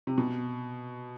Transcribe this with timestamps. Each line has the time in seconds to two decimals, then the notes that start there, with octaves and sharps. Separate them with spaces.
0.07 C3
0.18 B2